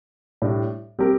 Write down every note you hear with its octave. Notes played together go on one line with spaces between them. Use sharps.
A2 G3 D4
G3 C4 G4 A#4